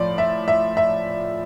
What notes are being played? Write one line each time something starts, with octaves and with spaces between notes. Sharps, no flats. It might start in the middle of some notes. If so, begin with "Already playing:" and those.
Already playing: A2 F3 D5
E5
E5
E5